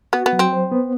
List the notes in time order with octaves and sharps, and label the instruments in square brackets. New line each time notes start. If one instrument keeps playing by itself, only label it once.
[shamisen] B3 [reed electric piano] F#4
[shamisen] B3
[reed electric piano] F#3
[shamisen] C4
[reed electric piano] C5
B3